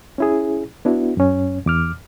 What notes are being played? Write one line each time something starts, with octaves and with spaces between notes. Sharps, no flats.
C#4 E4 G#4
B3 D4 E4 F#4
F#2 C#4
E2 D6 F6